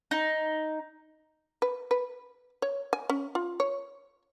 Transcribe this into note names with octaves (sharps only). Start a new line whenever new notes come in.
D#4
B4
B4
C#5
G#5
C#4
F4
C#5